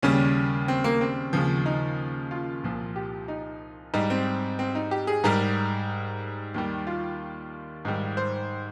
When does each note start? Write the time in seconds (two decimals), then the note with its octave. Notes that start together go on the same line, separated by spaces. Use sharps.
0.02 D#2 C#3 G3 C#4
0.68 C4
0.84 A#3
1.01 C4
1.33 D#2 C#3 F3
1.66 D#4
2.31 F4
2.64 C2 A#2 F3
2.96 G4
3.28 D#4
3.94 G#2 G3 D#4
4.10 C4
4.59 C4
4.75 D#4
4.91 G4
5.07 G#4
5.24 G#2 G3 A#4
6.54 D#2 D#3 G3
6.87 F4
7.85 G#2 D#3 G3
8.17 C5